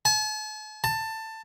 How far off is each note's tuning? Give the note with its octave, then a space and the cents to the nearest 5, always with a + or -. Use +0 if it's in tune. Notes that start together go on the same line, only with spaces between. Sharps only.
A5 -45
A5 +15